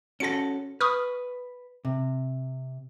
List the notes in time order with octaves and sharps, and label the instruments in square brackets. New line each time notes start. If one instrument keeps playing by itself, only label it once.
[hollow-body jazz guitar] C#4 F#4 A4 [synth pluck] A#6 C#7
[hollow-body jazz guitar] B4 [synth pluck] C#6 D#6 F6
[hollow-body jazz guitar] C3